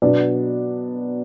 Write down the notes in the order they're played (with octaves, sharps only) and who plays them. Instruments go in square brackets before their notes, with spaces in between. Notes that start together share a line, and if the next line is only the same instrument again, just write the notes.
[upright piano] B2 F#3 B3 D4